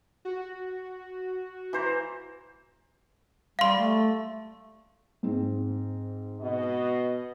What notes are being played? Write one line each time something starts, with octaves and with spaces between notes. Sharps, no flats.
F#4
E3 C5 A#5
G3 F5 C6
A3
G#2 C4
B2 D#5